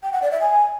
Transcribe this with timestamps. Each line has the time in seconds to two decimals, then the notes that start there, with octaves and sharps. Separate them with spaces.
0.03 G5
0.13 F#5
0.22 D5
0.32 E5
0.41 G#5